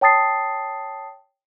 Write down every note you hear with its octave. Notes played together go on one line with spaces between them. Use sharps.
C#5 G5 A5 D#6 A6 C7